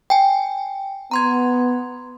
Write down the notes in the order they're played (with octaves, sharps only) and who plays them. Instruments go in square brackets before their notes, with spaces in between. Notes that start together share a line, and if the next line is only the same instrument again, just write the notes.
[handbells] G5 G#5
[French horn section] B3 [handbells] A#5 C6 G#6